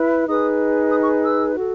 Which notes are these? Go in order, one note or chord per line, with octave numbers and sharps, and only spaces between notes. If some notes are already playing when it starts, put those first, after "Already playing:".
Already playing: E4 B4
D#4 G#4 B4 D#6
D#6
C#6
E6
F#4 A4